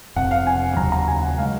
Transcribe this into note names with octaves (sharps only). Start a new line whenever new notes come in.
F1 F2 C3 F#5
F5
G#5
D#2 C#3 F#3 C#4 A#5
A#5
G#5
F#5
C#3 G#3 F5